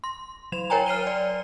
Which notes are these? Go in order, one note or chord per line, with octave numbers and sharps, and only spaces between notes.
C6
F#3 E7 F7
A#4 C#5 G5 G#5 A#5
F6 C7 D#7 G7
D5